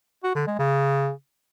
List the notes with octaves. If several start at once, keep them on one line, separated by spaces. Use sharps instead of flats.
F#4
D3
G#3
C#3